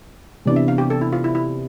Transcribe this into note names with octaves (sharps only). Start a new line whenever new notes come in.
C3 E3 B3 D4 D5
E5
F5
G4
A4
E4
F4
E4
E4